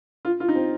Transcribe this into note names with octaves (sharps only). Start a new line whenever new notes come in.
F4
F4
D#4
C4